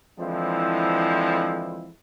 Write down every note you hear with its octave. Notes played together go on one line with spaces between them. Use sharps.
D3 E3 F3 G#3 C4 E4